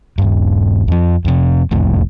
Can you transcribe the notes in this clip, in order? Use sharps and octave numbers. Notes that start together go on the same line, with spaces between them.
D#1 G2
F2 F3
F2 C3
E1 C2 F2 A2